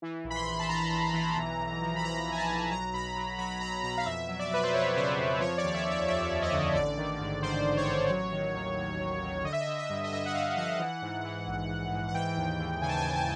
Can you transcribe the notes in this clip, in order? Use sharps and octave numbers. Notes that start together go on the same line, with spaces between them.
E3
A#1
B5
C6
A#1
A5
A#1 A#5
A#1
E3
B1
B1
F3
B5
B1 A#5
B1
G#5
A5
B1
F#3 A#5
B1 B5
F#3
F#3 B5
B1 A#5
B2 A#5
F5
F2 E5
F#3
D5
F#3 B4
C5
F2 C#5
C#3 C5
F2
F3 C#5
D5
D#2
E5
F3
E5
F3 E5
D#2
D#5
D3
A1 D5
D#3
G#2
D#3 C5
G#2
C#5
A1
F#3
D#3
D#2
D#2
D#2
D#3
D3 D#5
E5
D#5
D3
E5
G2
D#5
G2 E5
F#5
G2 F5
F3 F#5
E3
G#2
E3
A#1
G#2
G#2
F#5
E3 G5
D#2
D#2
C#3 G#5
A5
G#5
D#2
A5